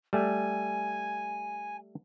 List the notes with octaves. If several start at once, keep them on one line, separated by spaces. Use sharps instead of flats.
G3 A3 G#5